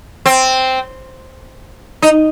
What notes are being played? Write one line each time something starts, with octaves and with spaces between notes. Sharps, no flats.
C4
D#4